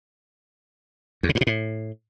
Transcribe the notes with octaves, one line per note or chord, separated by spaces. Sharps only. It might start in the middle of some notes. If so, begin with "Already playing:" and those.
E2
C#3
G2
B2
A2